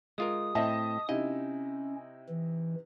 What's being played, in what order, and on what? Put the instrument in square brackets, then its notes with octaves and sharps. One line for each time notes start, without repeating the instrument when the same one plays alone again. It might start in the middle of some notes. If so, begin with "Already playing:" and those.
[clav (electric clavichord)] G#3 F4 A#4 [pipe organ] D#6
[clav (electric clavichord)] A2 C4 [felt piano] D#5 E5 A5
[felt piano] C3 D#4 E4 [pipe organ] C#4 [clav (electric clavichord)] D#5
[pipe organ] E3